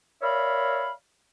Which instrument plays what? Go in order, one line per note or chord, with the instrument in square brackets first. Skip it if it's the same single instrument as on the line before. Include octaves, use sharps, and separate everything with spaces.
[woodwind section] A#4 C#5 D5 E5 F5 B5